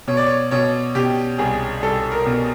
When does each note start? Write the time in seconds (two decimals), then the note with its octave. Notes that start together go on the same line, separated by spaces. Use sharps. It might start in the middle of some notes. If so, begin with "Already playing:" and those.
0.08 B2 C#5
0.17 D5
0.26 C#5
0.51 B2 C#5
0.95 B2 G4
1.38 C2 G#4
1.82 C2 A4
2.12 A#4
2.26 B2